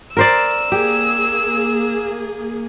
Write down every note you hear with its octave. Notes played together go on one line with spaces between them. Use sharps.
A#4 C5 D5 E6
A#3 G4 G#4